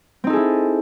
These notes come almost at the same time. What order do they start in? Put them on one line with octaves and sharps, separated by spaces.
C4 D#4 A4 G#4 E4